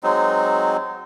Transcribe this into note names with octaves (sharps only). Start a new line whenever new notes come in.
F#3 G#3 C4 D#4